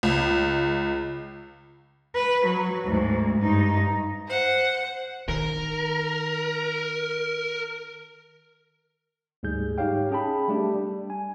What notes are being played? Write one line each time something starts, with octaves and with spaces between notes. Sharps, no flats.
C#2
B4
F#3
D2 G#2
G2 D#4
C5 F#5
D#3 A#4
D2 G#2 G3 G#4 G6
D#4 G4 C#5 F5 G5
C#4 G#4 G5 A5 B5
G3 A3 D4 G4
G3
G#5